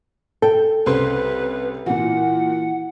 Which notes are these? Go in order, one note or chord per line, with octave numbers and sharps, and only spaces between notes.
A4 G5
C2 C#3 B4 C5 C6
A#2 E3 F#4 F#5